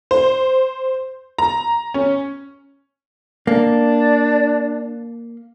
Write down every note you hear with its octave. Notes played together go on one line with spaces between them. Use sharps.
C5
A#5
C#4
A#3 D4